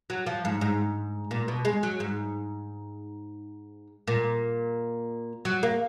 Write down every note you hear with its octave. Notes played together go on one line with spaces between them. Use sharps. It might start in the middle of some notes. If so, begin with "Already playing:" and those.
F#3
F3
G#2
G#2
A#2
B2
G#3
F#3
G#2
A#2
F#3
A#3